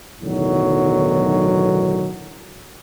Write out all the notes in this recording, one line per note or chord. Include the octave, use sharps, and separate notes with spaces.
B1 E2 A2 D3 D#3 F#3